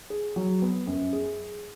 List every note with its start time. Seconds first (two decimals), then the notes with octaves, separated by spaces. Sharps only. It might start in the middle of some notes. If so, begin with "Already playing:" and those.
0.10 G#4
0.36 F#3
0.62 B3
0.87 F#2
1.13 G#4